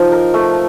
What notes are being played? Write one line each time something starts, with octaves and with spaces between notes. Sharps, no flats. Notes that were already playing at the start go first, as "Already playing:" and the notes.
Already playing: F3 D#4
A#4
A3